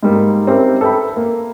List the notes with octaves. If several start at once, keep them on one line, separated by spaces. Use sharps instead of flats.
G#2 G3 A#3
C4 C#4 D#4 G4 A#4 E5
A4 B4 E5 G5 B5
A#3